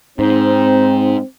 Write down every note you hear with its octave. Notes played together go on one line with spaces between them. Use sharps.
G#2 C4 D#4